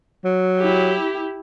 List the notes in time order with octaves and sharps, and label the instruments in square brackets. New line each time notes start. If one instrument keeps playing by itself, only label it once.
[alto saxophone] F#3
[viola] E4 G4